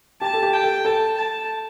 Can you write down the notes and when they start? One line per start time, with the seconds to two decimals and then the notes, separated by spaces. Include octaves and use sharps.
0.21 G4 A5
0.34 A4
0.43 G4
0.53 G5
0.64 A4
0.85 A4 A5
1.17 A5